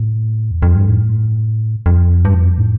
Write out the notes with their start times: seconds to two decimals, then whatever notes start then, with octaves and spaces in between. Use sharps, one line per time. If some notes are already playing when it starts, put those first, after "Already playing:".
Already playing: A2
0.51 E2
0.62 F2
0.76 G2
0.89 A2
1.86 F2
2.25 G2
2.34 F2
2.58 A2